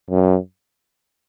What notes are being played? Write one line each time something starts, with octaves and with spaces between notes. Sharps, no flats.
F#2